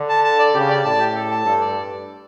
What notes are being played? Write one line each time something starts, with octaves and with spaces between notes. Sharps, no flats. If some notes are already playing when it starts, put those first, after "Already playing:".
Already playing: D3
A5
A5
D5
C#3 G4
D5
A2 A5
G4
A4
A5
G2 A4
D5